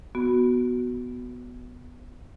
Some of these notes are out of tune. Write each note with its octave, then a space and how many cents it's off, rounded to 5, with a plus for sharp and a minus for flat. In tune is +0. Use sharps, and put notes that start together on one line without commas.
B3 +0 F#4 +0